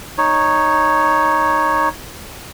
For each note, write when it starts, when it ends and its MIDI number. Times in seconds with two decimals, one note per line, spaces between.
0.18 1.89 63
0.18 1.89 73